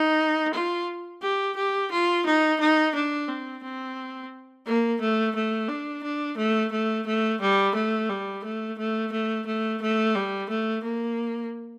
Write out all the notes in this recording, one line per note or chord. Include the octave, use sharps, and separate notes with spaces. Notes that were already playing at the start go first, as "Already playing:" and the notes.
Already playing: D#4
F4
G4
G4
F4
D#4
D#4
D4
C4
C4
A#3
A3
A3
D4
D4
A3
A3
A3
G3
A3
G3
A3
A3
A3
A3
A3
G3
A3
A#3